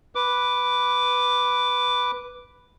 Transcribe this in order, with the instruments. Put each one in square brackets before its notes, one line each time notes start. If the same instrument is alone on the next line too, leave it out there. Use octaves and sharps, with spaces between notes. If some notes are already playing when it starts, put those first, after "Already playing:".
[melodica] B4 D6